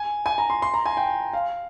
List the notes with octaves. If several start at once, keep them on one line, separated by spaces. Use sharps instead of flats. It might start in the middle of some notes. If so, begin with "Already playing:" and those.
Already playing: G#5
G#5
A#5
C6
C6
A#5
G#5
G5
F5